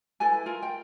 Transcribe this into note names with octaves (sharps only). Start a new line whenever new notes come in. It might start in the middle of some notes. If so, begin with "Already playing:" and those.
E4 A4 B4 G#5
F4 A#4
G5